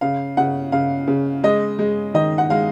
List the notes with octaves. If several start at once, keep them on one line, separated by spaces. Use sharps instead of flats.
C#3 F5
C#3 F#5
C#3 F5
C#3
G#3 D#5
G#3
D#3 D#5
F#5
G#3 F5